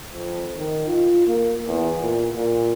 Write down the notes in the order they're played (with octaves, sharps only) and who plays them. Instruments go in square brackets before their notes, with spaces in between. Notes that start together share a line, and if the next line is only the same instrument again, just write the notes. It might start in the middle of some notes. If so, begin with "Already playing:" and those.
[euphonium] F2
D#3
F4
A#3
E2
A#2
A#2